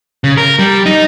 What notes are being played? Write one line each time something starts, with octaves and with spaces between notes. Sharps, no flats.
C#3
A#4
G3
D#4